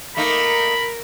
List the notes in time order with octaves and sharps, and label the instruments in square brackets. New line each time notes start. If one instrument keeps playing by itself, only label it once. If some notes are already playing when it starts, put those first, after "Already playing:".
[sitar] A3 A#3 D#4 [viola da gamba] A#4 [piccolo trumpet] B5